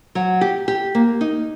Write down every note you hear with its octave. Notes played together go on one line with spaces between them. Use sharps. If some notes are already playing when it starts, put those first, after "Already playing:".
F#3
G4
G4
A#3
D#4